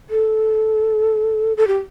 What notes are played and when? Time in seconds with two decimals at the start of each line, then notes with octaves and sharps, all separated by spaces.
0.10 A4
1.57 A4
1.67 G4